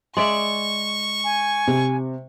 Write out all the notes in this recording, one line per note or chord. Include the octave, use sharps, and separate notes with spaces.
G#3 D5 E5 C#6
G#5
C3